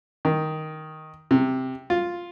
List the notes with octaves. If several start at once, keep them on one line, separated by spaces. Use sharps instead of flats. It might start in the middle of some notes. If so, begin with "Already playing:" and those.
D#3
C3
F4